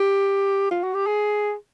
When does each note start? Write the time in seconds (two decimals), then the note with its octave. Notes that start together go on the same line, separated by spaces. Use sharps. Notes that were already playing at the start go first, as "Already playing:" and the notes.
Already playing: G4
0.71 F4
0.83 F#4
0.94 G4
1.07 G#4